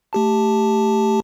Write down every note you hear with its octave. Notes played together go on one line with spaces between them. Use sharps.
A3 G4 A5